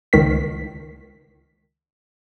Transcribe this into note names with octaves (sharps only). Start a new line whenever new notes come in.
C#2 D#3 B6